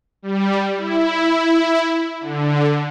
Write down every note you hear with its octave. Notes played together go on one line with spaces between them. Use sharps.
G3
E4
D3